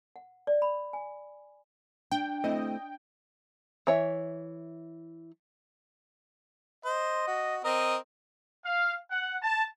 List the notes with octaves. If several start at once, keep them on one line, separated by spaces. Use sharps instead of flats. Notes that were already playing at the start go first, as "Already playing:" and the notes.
F#5
D5
B5
G#5
D4 G5
A3 C4 E4 D#5
E3 C#5 E5
C5 D#5
F#4
C4 A#4 D#5 D#6
F5
F#5
A5